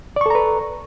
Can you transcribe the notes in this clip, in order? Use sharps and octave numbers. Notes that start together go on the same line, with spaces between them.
A4 B4 D5 A#5 C#6